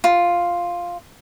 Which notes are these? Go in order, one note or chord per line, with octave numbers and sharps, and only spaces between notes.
F4